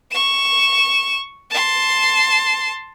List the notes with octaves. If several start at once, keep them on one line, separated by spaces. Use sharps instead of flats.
C#6 E7
A5 C6